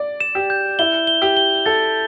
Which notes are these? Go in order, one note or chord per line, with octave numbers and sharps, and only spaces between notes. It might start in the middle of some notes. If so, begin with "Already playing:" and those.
Already playing: D5
E7
G4
G6
E4 G7
G7
G4
G7
A4 A6